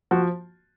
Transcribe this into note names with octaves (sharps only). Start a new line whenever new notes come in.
F3 F#4